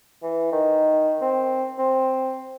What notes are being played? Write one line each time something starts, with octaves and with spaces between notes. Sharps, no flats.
E3
D#3
C4
C4